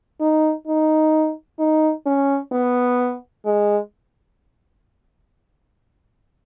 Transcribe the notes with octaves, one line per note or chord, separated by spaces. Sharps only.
D#4
D#4
D#4
C#4
B3
G#3